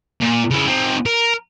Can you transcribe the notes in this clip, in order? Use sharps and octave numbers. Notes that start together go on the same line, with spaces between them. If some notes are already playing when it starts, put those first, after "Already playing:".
A#2
C#3 E4
C4 D#4
A#4